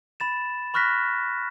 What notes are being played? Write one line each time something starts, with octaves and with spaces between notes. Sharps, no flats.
B5 A6 E7
B5 C#6 F6 F#6 A#6 B6